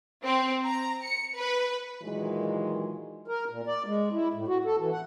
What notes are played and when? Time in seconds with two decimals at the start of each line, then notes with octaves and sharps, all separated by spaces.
0.24 C4
0.65 A#5
1.03 C#7
1.36 B4
2.02 A#2 D#3 E3 F#3 G#3
3.28 A#4
3.49 A#2
3.67 D5
3.86 G#3
4.13 E4
4.33 A2
4.47 F#4
4.65 A4
4.78 E3
4.92 F#5